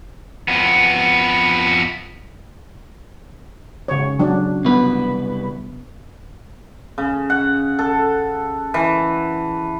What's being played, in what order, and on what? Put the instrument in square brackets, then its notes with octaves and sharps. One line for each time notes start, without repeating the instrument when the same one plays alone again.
[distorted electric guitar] F2 B3
[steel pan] C#3 C#5
F#3 D4
[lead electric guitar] C2 B4 [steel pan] B3
[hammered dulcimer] C#3
F#5
A4
E3